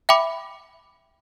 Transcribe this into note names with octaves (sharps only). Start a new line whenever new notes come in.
E5 G5 B5 D6